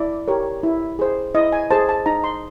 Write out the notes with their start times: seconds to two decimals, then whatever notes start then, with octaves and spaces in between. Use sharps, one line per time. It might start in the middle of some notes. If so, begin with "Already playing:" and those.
Already playing: E4 D5
0.28 G4 A#4 C#5
0.63 E4
0.99 G#4 C5
1.35 E4 D#5
1.52 G#5
1.71 G#4 C5 A5
1.89 A5
2.06 D#4 A#5
2.24 C6